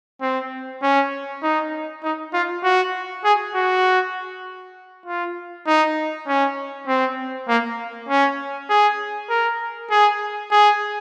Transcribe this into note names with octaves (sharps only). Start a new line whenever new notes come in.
C4
C#4
D#4
D#4
F4
F#4
G#4
F#4
F4
D#4
C#4
C4
A#3
C#4
G#4
A#4
G#4
G#4